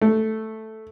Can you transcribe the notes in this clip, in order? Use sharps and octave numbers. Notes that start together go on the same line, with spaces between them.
A3